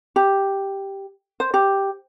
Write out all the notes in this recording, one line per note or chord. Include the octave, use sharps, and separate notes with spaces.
G4
C5
G4